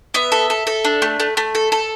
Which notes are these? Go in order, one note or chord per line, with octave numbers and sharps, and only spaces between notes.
B3 E5
A4
A4
A4
D4
A3
A3
A3
A4
A4